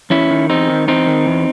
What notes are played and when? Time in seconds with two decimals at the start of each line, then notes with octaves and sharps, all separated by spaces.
0.10 E2 C#4 E4
0.31 D#3
0.50 E2 C4 D#4
0.69 D#3
0.87 E2 C4 D#4
1.07 D#3
1.26 E2